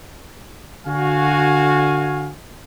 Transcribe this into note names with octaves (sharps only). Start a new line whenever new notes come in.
D3 F#4 F5 G#5